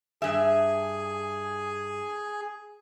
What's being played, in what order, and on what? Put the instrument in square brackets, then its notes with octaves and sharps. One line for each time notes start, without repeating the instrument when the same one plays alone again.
[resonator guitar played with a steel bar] G2 E5 [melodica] G#4